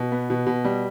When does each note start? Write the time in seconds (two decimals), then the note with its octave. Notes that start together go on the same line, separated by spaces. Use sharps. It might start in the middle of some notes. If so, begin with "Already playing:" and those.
Already playing: B2
0.12 B3
0.30 B2
0.47 B2
0.65 G3